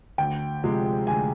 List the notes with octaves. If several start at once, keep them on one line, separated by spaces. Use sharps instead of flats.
D2 G5
C3 F3 G#3
D2 G#5